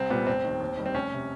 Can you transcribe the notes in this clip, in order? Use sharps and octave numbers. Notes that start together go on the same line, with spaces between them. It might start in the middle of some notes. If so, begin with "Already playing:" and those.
Already playing: C2 C4
A#2 G3 B3
F1 C4
D#2 D#3
D#2
D#3 G3
C4
F1 C#4
C3